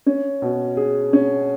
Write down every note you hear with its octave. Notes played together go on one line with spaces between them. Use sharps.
C#4
B2
G#4
C#4